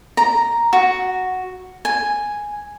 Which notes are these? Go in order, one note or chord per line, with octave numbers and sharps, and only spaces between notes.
A#5
F#4
G#5